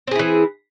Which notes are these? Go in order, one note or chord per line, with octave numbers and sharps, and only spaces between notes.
E3 C4 E4 G#4